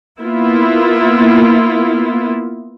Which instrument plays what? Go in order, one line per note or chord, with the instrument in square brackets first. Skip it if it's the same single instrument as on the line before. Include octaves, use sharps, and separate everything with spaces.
[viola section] A#3 B3 E4 F4